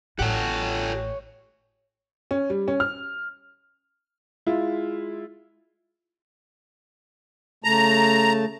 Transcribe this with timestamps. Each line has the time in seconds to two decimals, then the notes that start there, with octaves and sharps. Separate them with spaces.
0.19 A1 A2 G4 A4 C#5 F#5
2.31 C#4
2.50 G3
2.68 C#4
2.80 F6
4.46 G#3 E4 F4
7.64 C#3 A3 A5 A#5